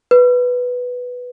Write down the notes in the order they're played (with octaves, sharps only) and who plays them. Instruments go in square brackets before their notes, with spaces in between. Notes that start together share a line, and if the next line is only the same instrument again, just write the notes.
[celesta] B4